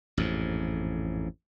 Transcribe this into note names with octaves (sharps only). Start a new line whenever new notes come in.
A1 F2 G#2